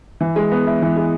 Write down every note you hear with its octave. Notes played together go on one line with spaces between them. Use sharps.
E3
G#3
B3
E4
E3
G#3